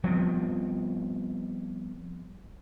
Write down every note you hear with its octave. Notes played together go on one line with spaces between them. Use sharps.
F3 G3 B3 C4